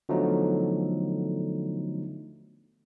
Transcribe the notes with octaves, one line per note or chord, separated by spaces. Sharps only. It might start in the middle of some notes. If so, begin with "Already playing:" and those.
D3 F3 F#3 A3 B3 D#4